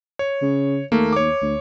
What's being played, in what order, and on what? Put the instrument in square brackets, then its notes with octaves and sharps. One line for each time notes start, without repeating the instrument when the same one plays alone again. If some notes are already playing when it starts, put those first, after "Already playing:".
[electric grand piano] C#5
[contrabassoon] C#3
[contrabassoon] D#2 [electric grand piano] A3 A#3
[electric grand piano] C#5 D6
[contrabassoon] D2